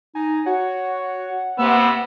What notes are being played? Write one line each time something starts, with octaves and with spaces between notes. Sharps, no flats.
D#4 G#5
F#4 C#5 F#5
C3 A#3 B3 E6